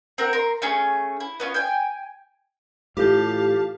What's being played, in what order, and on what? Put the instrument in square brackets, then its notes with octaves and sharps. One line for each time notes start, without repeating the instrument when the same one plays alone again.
[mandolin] C4 A#4 F#5
A#4 C6
A3 C#4 G#4
E4
B3 C#4 F4
G5 G#5
[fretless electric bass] A2 E3 [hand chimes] F4 A4 G6 [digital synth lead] G4 [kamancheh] F5 A5